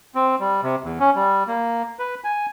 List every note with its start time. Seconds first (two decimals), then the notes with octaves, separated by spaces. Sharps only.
0.15 C4
0.40 G3
0.63 C3
0.84 E2
1.00 C#4
1.15 G3
1.47 A#3
1.99 B4
2.24 G#5